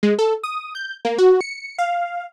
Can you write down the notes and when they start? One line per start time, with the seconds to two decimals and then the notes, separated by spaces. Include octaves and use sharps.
0.03 G#3
0.19 A4
0.43 D#6
0.75 G6
1.05 A#3
1.18 F#4
1.41 C#7
1.78 F5